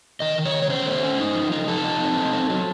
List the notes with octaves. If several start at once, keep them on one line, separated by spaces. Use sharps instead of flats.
D#3 D#5
D#3
C#5
D#3
C#5
C#4 C5
A3
C#4
D#4
F3
D#4
F3 A4
D#4
C4
D#4
C4
F#3